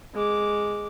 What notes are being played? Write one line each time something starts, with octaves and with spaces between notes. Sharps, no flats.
G#3 D6